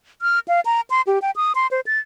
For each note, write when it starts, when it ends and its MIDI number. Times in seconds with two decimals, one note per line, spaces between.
0.22 0.39 89
0.48 0.61 77
0.65 0.81 82
0.90 1.02 84
1.07 1.19 67
1.22 1.31 79
1.36 1.52 87
1.55 1.67 84
1.71 1.80 72
1.87 1.99 93